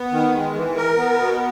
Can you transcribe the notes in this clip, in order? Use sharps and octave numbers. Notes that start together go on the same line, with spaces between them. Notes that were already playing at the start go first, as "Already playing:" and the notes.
Already playing: B3
D#3
G#3
E3
A#4
B3
B2